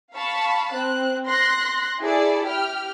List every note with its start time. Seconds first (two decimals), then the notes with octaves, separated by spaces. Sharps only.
0.14 F5 A5 B5 C#6
0.74 C4 F#6
1.27 C6 F#6 A#6
2.02 E4 G#4 A4 D5
2.46 G4 G5 F6